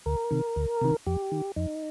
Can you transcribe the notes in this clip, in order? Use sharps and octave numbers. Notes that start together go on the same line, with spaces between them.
D2 A#4
C3 D#3
D2
C3 D#3
F2 G4
D#3
F2 D#4